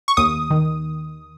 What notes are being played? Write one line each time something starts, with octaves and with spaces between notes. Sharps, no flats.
C#6
D#2 D#6
D#3